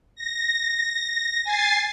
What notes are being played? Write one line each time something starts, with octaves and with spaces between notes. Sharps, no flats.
A#6
G#5 A6 C7